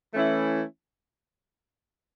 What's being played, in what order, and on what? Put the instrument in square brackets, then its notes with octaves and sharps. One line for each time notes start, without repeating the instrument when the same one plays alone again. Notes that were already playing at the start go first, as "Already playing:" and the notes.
[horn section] E3 A3 C#4 E4